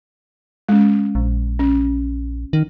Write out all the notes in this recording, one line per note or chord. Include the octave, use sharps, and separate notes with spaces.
G#3 C#4
A#1
C#4
D#3